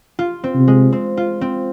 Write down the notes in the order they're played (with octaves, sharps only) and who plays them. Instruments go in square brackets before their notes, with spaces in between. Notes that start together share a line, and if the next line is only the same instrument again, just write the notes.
[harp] F4
C4
[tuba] C3
[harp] G#3
C4
F4
C4